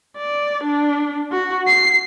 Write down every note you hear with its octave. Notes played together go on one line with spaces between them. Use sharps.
D5
D4
F#4
C7